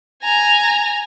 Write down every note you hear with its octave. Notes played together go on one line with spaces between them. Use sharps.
G#5 A#5